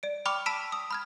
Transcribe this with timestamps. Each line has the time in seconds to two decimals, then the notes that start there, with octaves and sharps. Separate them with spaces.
0.03 D5 D7
0.25 G5 B5 C#6 D6 F6 F7
0.46 A5 B5 E6 B6 D7 E7
0.72 D#6
0.91 B5 F6 G#6